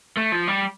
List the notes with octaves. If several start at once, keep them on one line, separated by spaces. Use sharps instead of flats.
A3
F3
G3